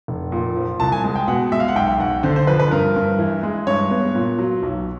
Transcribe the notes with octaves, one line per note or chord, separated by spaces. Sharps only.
F1
A#2
F3
C2 A5
G#5
G#3
G5
B2 F#5
G#3 E5
F5
F#5
B1 G5
B1 F#5
D3 C5
C5
F3 B4
B4
G2 A#4
G2
E3
G#3
G2 C#5
B3
A#2
F#3
B1